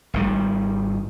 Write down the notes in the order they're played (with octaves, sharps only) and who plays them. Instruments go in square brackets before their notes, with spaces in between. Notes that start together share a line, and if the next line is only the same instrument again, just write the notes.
[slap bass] G#1 D#3 G3